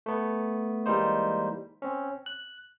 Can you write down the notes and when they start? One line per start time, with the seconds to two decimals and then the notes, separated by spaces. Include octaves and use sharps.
0.06 A3 B3
0.86 E3 G3 G#3 A#3 D#4 C5
1.82 C4 C#4
2.26 F#6